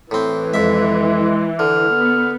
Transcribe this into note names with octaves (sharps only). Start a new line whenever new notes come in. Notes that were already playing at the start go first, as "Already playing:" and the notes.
A2 E3 C4
F2 G#3 E5
D3 F6
B3